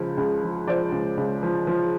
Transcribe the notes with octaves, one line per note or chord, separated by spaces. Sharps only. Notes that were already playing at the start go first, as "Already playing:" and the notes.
Already playing: C#2 C#3 F3
C#2
F3
F3 C5 D5
C#2
C#2
F3
F3